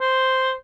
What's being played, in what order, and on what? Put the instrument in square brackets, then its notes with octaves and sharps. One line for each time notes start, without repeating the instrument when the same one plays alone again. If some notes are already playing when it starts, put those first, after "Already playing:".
[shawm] C5